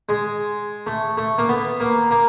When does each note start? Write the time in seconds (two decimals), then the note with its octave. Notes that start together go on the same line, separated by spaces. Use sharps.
0.09 G#3
0.87 A3
1.18 A3
1.38 A#3
1.49 B3
1.80 A#3
2.11 A#3